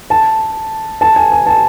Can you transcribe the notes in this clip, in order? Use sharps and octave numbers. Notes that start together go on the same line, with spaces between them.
A5
A5
G#5
G#5
A5